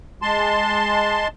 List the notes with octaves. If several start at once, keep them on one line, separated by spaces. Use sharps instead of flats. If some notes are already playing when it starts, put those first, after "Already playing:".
G#3 A5 C6